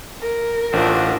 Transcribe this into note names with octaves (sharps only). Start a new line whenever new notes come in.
A#4
A1 A3 C4 D4 F4 F#5